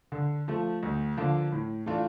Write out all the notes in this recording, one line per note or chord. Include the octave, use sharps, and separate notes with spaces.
D3
F3 A3
D2
D3 F3 A#3
A2
E3 A3 D4 F4